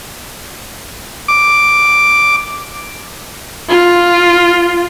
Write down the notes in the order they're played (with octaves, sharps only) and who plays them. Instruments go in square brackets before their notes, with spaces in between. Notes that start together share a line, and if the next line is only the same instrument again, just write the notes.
[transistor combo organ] D6
[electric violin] F4